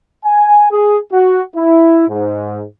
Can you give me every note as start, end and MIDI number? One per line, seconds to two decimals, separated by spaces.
0.25 0.70 80
0.71 0.98 68
1.12 1.42 66
1.56 2.07 64
2.08 2.63 44